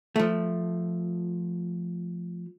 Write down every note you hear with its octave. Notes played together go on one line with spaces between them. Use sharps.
F3 A3